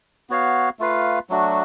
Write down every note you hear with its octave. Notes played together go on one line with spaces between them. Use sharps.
B3 F#4 C#5 F5
A3 F4 B4 F5
F#3 A3 D4 F#4